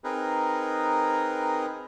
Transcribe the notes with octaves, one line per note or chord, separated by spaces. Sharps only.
C4 D#4 G#4 A#4 B4